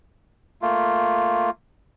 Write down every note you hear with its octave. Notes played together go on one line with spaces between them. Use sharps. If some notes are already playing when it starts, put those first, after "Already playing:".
A3 A#3 F4